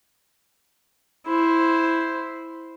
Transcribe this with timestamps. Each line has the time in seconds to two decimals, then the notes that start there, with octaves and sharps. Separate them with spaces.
1.26 E4 C5